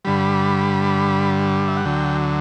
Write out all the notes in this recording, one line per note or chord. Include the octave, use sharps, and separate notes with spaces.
G2 D3 G3 B5
E5
F#5
D2 D3 F#3 G5